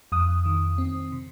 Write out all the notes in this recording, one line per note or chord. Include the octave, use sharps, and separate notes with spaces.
F2 D#6
D#3
C4
C3